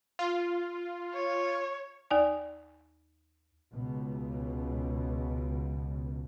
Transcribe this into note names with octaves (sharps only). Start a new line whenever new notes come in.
F4
C#5
D#2 D#4 D5 G#5
C#2 B2